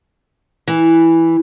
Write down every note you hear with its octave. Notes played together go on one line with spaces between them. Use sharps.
E3